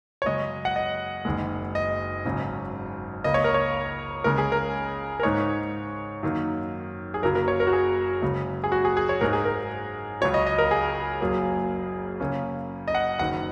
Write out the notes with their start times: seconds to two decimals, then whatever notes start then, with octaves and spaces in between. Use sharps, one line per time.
0.22 C#5
0.26 F#2 C#3 G#3 D#5
0.65 F#5
0.76 D#5
1.25 F#1 F#2 D#3 G#3
1.75 D#5
2.25 G#1 F#2 C#3 G#3 C#4
3.24 C#2 C#3 A#3 D#5
3.34 C#5
3.44 A#4
3.54 C#5
4.24 C#2 C#3 G#3 C#4 A#4
4.38 G#4
4.52 A#4
5.20 A#4
5.23 G#2 G#3 D#4 C#5
6.23 F#2 D#3 A#3 D#4
7.14 G#4
7.22 F#1 F#2 C#3 F#3 A#3 A#4
7.35 A#4
7.48 C#5
7.60 A#4
7.67 F#4
7.73 G#4
8.22 F#1 F#2 C#3 G#3
8.64 G#4
8.72 F#4
8.85 G#4
8.97 G#4
9.09 C#5
9.21 G#2 G#3 D#4 A#4
9.33 G#4
9.45 A#4
10.21 C#2 C#3 F#3 C#5
10.34 D#5
10.46 D#5
10.58 A#4
10.71 G#4
11.21 F#1 F#2 F#3 A#3
12.20 F#2 C#3 A#3 C#4
12.88 D#5
12.95 F#5
13.19 F#1 F#2 D#3 F#5